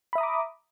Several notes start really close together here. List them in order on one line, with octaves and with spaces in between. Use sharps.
B5 E5 D#6 A#5 D6